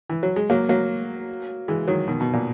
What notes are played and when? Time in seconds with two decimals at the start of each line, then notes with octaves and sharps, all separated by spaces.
0.10 E3
0.23 F#3
0.36 G#3
0.50 F#3 A#3
0.69 F#3 A#3
1.68 E3 G#3
1.88 D#3 F#3
2.08 B2 D#3
2.21 B2
2.33 A#2